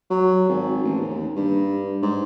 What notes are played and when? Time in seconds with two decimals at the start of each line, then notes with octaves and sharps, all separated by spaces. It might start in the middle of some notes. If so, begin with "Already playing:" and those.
0.10 F#3
0.49 G#1
0.83 A1
1.01 D#2
1.36 G2
2.02 G#2